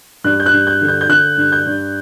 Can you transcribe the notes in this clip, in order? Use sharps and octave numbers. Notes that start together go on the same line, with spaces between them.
G2 F#6
G6
F#6
G2
G6
D3
G6
G6
D3 F#6
G2
G6
G2